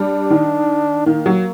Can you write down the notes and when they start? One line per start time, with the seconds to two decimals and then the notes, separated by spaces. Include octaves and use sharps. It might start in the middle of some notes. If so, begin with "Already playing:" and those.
Already playing: G3 D4
0.30 D#3
1.06 D#3 A#3
1.26 F#3